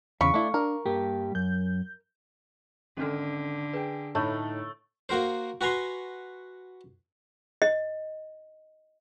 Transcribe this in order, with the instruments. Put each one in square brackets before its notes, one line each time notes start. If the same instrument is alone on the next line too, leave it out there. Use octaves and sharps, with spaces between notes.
[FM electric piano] E2 C#3 [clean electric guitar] F5 [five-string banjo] B5 [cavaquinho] C#6
[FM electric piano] A3 [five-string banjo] D4 E4
[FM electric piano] D4 [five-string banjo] A#4
[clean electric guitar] G2 G3 G4 [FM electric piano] A#3
[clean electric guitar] F#2 [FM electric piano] G6
[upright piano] G#1 F6 [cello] D3 [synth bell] C#4 D4 A4
[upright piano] G#4 G5 [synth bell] B4
[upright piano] A2 D#4 B5 [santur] A3 [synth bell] C#5
[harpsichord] A#3 F#4 A#4 C5
F#4 B4 G#5 A#5 C6
[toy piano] D#5